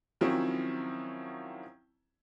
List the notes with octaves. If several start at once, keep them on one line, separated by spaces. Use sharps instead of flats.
D#3 F3 F#3 C4 C#4 E4